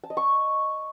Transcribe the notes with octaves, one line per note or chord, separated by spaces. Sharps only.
A5
D#5
C#6